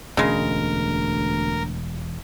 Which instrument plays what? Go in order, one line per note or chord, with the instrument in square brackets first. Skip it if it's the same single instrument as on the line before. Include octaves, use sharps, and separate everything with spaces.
[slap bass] E1 [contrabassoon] D2 [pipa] C#3 G#3 [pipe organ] A#4